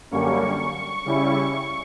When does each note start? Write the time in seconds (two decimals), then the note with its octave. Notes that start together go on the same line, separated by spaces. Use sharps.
0.11 F#2 D3 G3 A#3 C#4 C#6
1.05 C#3 G3 C#4 E4